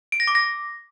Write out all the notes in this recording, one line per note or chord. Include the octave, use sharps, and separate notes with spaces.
D7
A#6
D6
A#6